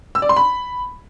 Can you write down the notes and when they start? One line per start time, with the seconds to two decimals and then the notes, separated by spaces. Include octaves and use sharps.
0.15 E6
0.22 D5
0.29 C6
0.36 B5